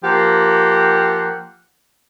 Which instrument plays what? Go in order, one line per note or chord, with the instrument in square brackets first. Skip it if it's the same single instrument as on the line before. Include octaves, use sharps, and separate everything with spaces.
[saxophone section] F3 A#3 G4 F#5